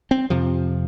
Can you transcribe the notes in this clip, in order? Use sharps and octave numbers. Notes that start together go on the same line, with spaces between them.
C4
F2 C3 F3